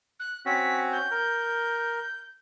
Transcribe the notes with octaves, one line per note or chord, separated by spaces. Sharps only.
F#6
C4 C#4 F#4 B6
G6
A#4